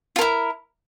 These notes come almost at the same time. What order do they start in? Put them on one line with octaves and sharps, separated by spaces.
F4 A#4 E4